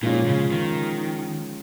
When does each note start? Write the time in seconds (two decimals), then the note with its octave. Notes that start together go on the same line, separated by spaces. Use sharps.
0.02 A#2 F3 G#3 C#4 F4
0.27 C#3
0.52 D#3